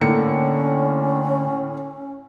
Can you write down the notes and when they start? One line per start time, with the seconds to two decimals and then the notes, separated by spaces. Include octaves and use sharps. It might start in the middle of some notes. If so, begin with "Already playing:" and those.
0.01 A2 D3 A#3 C#4 C#7